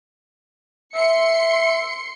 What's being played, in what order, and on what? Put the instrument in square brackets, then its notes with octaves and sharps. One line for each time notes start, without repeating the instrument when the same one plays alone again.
[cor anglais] E5 [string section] C6 C#7